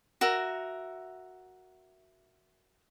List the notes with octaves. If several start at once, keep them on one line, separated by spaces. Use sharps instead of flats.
F#4 A#4 E5